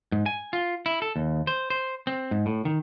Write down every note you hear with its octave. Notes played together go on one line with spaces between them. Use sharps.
G#2
G#5
F4
E4
A4
D#2
C5
C5
C4
G#2
A2
D#3